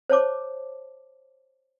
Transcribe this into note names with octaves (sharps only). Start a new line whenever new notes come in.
C5 C#5 A5 D6